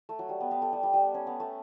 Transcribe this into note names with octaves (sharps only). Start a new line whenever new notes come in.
A3
F#3
G3
B3
B3
A3
G3
G3
G3
C#4
B3
A3